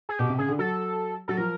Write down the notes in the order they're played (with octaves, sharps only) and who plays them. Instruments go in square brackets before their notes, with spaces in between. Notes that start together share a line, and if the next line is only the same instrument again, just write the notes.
[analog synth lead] G#4
[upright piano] B2 [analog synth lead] G4
[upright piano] C3
[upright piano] C#3 [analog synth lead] G#4
[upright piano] D3
[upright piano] F#3 [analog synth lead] A4
[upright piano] F#3 [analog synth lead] A4
[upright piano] F3 [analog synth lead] A#4